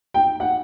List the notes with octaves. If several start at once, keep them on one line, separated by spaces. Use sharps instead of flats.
G5
F#5